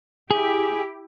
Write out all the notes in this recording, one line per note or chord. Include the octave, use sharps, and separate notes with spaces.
E4 G4 G#4